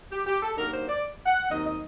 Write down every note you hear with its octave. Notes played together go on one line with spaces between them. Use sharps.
G4
G4
A4
G2 F#3 A#3 D#4 A#4
C5
D5
F#5
D#2 D#3 F#3 C4 D#4 D#5
D#5